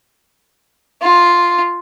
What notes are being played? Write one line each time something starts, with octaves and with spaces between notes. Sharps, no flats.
F4